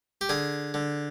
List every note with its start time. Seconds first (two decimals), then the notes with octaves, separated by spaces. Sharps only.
0.21 G4
0.29 D3 G#4
0.74 D3